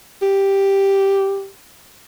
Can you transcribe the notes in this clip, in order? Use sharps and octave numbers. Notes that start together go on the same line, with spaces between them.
G4